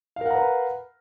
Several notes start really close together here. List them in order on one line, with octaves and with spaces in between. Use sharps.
F5 A#4 F#5 A#5 B4